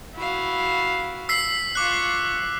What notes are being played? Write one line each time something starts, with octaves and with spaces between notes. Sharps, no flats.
E4 F#4 F5
E6 B6 C7
F4 C#6 D6 F#6